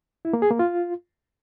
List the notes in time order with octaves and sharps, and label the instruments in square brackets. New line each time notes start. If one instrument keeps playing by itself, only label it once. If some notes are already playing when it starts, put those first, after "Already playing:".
[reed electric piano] E4
A#3
G#4
A#3
F4